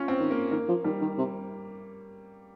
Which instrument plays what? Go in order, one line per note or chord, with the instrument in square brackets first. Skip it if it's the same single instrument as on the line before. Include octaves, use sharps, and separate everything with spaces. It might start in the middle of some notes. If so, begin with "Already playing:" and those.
Already playing: [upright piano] C#4 F4
C4
[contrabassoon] D#3
[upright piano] A#3
[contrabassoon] D#3 [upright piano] A#3
[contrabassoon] F3
[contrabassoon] D#3 [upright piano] G3
[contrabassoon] D#3
C3